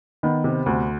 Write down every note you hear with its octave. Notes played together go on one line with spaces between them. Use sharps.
D#3 B3
C3
D2